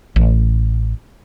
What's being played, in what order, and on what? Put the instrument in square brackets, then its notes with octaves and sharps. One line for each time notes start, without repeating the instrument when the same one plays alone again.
[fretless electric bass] A1